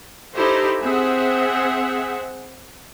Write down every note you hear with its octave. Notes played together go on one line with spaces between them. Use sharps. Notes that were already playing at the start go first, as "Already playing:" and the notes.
D#4 E4 G4 A4 C5
C4 G#4 E5 F#5